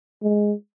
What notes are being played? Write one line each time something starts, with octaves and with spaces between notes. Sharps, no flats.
G#3